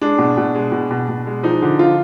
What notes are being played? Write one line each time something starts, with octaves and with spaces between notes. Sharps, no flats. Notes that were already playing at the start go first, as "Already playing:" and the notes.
G#3 D4
B2
B2
G#3
B2
B2
B2
G#3
F3 D#4
D3
F3 F4